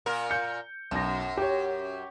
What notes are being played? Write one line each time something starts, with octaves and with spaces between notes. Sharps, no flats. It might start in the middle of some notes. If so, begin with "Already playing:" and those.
A#2 A#4
G6 C#7
B1 F#2 A#6
G4 C#5